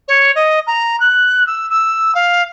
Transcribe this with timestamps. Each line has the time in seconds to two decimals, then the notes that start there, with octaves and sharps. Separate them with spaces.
0.08 C#5
0.35 D#5
0.67 A#5
1.00 F#6
1.47 E6
1.70 E6
2.15 F5